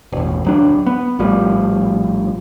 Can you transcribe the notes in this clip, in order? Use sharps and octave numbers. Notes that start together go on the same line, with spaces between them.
E1 A1
D1 F#3 D4
B3
A#1 A2 F3 G3